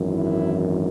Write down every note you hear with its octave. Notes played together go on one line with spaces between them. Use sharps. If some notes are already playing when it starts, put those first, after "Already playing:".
Already playing: G#1 F#2 E3
E4